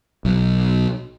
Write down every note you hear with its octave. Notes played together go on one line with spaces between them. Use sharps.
B1